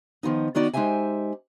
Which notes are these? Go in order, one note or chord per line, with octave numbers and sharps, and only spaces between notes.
D#3 F3 B3 D#4
D#3 B3 D#4 F#4 D5
G#3 D#4 G4 C5 E5 G#5